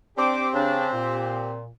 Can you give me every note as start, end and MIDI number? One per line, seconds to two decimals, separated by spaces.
0.18 1.58 60
0.18 0.46 62
0.18 1.58 67
0.18 0.46 72
0.18 0.46 86
0.54 0.88 49
0.54 0.88 62
0.93 1.67 46